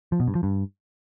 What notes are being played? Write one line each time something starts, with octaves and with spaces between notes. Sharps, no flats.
F3
B2
G2
F3
G2